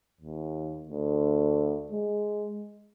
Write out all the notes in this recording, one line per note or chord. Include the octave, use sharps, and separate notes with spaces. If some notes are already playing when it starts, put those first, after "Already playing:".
D#2
D2
G#3